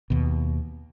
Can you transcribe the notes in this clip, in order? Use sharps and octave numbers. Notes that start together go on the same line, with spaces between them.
D#2 B2